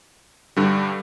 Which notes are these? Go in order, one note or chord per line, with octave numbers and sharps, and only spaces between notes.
G2 D3 G3